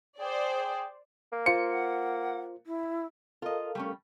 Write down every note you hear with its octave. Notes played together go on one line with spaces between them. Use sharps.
G#4 C5 D5 G5
A#3
F4 C5 C#7
F#5
E4
F4 A4 A#4 D#5 F5
G3 A3 C#4